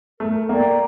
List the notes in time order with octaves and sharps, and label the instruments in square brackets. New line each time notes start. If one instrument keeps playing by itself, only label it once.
[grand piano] A3 [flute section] A#4
[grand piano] A#3 [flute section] D5 G5 A#5